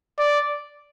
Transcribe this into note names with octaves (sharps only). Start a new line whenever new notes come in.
D5